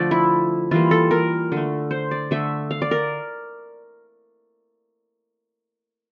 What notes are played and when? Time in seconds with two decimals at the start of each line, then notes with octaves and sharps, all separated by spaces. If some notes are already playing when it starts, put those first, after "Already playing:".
Already playing: D3 F3 A3 D5
0.11 E4
0.71 E3 G3 A#3 F4
0.91 A4
1.11 A#4
1.52 D3 A3
1.91 C5
2.11 D5
2.31 D3 A3 E5
2.71 F5
2.82 D5
2.91 A#4